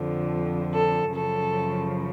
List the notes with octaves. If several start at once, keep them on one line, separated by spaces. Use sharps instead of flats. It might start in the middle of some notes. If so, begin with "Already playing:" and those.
Already playing: F2 D3 F3
A4
F#2 C#3 F3 A4